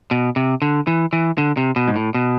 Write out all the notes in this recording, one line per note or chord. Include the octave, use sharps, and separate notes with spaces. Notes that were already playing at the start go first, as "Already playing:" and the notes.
B2
C3
D3
E3
E3
D3
C3
B2
G#2
A2
B2